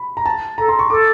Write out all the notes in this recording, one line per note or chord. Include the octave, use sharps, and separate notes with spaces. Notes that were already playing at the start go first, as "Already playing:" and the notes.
Already playing: B5
A#5
A5
A4 A#5
C6
C#6
A4 D6